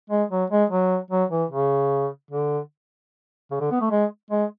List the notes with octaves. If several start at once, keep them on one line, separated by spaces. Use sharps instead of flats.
G#3
F#3
G#3
F#3
F#3
E3
C#3
D3
C#3
D3
B3
A3
G#3
G#3